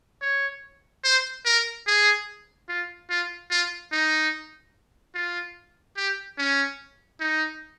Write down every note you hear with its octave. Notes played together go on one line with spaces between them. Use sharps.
C#5
C5
A#4
G#4
F4
F4
F4
D#4
F4
G4
C#4
D#4